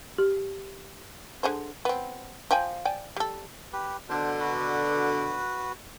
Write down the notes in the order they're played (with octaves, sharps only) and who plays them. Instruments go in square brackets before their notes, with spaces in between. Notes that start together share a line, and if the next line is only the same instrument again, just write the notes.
[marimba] G4
[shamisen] D3 G#4 C5
B3 C4
F3 G5 G#5
D5 G5 G#5
G3 A4
[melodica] G4 B4
[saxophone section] B2 D3 [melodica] D4 C5
[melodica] F#4 B4